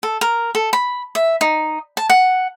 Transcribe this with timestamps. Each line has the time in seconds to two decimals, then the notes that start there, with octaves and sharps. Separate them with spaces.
0.03 A4
0.21 A#4
0.55 A4
0.73 B5
1.15 E5
1.41 D#4
1.97 A5
2.10 F#5